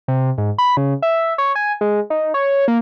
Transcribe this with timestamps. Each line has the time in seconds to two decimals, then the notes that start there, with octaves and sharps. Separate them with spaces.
0.08 C3
0.38 G#2
0.58 B5
0.77 C#3
1.02 E5
1.38 C#5
1.55 G#5
1.81 G#3
2.10 D#4
2.34 C#5
2.68 A#3